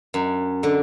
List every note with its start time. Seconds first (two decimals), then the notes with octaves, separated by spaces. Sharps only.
0.14 F#2
0.63 D3